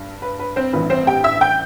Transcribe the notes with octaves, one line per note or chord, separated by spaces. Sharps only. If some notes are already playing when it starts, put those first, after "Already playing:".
Already playing: G2
B4
B4
C4 C5
A1 G2 E3 B4
C4 C5
G4 G5
E5 E6
G5 G6